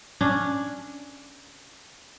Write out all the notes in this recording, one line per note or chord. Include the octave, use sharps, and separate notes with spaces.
C#4 D4